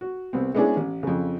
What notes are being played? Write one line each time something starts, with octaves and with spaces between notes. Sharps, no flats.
F#4
C2 B3 C4
G#3 B3 C#4 D4 E4 G#4
A1
F2 C#3